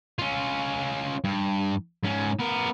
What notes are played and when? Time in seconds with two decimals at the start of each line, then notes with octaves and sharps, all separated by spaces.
0.19 C#4 F4
1.24 G2
2.03 G#2 C#4
2.39 B3 A#4